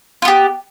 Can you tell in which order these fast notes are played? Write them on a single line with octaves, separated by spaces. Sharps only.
F4 B3 G4